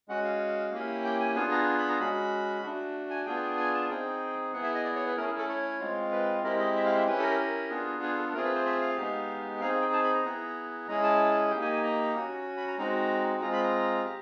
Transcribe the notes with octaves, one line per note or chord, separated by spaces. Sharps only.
G#3 C#4 F#4 F#5
F5
A#3 C#4 E4 G4
G5
G#5
B3 D4 F4 G#4 G#5
A#5
B5
A#5
G#3 C#4 F#4 B5
A3 D4 F#4
G#5
B3 D4 F4 G#4 G5
G#5
A5
C4 D#4 G#4 G5
B3 E4 G#4 F#5
E5
D#5
D5
C#5
B4
A3 C#4 E4 A#4
G#4
A4
C#5
G#3 C4 F4
B4
G#3 C4 E4 G4 A#4
D#5
E5
F5
E5
C#4 E4 G4 B4
A4
A#4
A#4
B3 D4 F4 G#4
G#4
A4
A3 C4 F4 G#4 A#4
B4
C5
E5
F5
G#3 B3 D#4 G4
C4 D#4 G#4 F5
G5
A5
B5
A#5
B3 E4 G#4
G#3 C#4 E4 G#4 A#5
A5
A#3 D#4 G4 G5
G#5
G#5
A#5
C#4 F#4
B5
A#5
G#3 C4 D#4 F#4 A#5
G#3 C4 F4 A#5
B5
A#5
G4